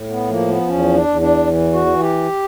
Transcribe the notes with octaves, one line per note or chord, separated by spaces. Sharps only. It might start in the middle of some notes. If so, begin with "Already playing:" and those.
Already playing: A2
B3
F3 A#3
B3
E2 C#4
D4
E2
D4
E3
F#4
E3
G4